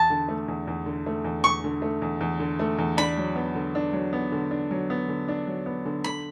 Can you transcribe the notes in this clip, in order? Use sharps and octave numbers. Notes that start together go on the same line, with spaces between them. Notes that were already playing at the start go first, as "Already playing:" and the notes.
Already playing: E2 A5
D3
A3
E2
E2
D3
A3
E2
E2 C#6
D3
A3
E2
E2
D3
A3
E2
D4 B5
F#3
B3
D3
D4
F#3
B3
D3
D4
F#3
B3
D3
D4
F#3
B3
D3
D3 B5